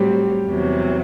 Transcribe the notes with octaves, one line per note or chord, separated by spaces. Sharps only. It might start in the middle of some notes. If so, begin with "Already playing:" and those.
Already playing: A2 F#3 G3 C4 G4
E2 C3 F#3